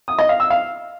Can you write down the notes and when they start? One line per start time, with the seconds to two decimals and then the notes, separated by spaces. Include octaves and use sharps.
0.08 D#6
0.19 D#5
0.29 F5
0.40 E6
0.50 F5